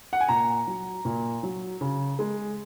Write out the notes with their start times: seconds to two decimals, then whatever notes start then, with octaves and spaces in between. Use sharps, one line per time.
0.13 F#5
0.20 G#5
0.28 A#2 A#5
0.67 F#3
1.05 A#2
1.43 F#3
1.81 C#3
2.19 G#3